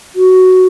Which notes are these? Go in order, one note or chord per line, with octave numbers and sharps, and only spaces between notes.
F#4